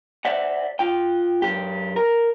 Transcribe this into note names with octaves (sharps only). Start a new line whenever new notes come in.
C5 D5 E5 F#5
F4 G5
F#2 G4
A#4